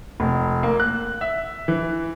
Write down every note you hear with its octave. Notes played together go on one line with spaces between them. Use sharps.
F1
A#3
F#6
E5
E3